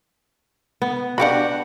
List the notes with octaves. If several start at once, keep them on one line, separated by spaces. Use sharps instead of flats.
B3
D4 F#4 G4 F5 F#5 B5